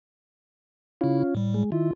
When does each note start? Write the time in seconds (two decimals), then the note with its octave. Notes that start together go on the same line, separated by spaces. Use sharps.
1.01 C#3 C#4 E4 F4
1.35 A2 G3
1.54 G#3
1.72 D#3 E4 F4